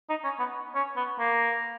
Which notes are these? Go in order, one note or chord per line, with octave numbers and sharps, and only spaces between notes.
D#4
C#4
B3
C#4
B3
A#3